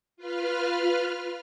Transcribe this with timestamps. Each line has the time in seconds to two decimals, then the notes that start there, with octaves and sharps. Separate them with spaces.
0.17 F4 B4 F6